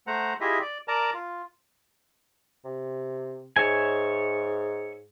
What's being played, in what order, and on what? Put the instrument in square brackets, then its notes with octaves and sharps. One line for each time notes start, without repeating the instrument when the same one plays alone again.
[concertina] A3 C5 F#5 A#5
E4 F4 G4 G#4 D#5 E5
D5
A#4 D5 A5 A#5
F4
[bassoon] C3
[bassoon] G#2 [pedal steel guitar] C#5 E5 G#5